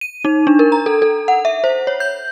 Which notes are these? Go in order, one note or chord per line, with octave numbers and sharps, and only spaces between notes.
D#7
D#4
D4
A#4
A#5
A4
A4
F#5
E5
C5
C#5
G6